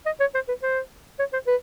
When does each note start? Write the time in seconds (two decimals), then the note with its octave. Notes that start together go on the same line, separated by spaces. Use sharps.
0.06 D#5
0.20 C#5
0.35 C5
0.48 B4
0.63 C5
1.19 C#5
1.33 C5
1.47 B4